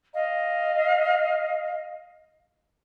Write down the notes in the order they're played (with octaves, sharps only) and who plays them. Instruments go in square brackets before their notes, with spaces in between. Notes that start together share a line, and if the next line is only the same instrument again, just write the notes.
[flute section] D#5 F5